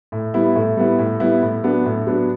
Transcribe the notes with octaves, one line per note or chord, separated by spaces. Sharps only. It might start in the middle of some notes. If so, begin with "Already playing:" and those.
A2
G3 B3 E4
A2
G3 B3 E4
A2
G3 B3 E4
A2
F#3 B3 D4
A2
F#3 B3 D4